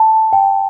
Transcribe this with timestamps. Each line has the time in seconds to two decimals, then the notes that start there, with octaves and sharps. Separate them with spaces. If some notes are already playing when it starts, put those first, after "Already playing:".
Already playing: A5
0.33 G5